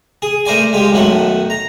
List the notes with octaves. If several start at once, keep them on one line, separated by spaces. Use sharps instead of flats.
G#4
A3 A#4 C5 D5 G#5
G#3 F4 G4
B1 F#2 D#3 A3 F#5
A#5